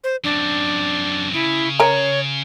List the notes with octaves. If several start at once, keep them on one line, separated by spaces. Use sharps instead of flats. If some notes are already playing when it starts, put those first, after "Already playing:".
C5
F#2 C4 D4
C#3 E4
A#4 C#5 A#5